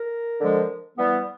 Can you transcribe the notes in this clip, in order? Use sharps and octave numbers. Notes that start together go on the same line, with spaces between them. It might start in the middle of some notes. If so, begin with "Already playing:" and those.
Already playing: A#4
D3 F3 G#3
E3 G3 B3